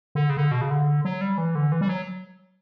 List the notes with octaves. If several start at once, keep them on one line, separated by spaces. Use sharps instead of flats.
D3
C#3
D3
B2
C#3
D3
F#3
G3
E3
D3
E3
G3
F#3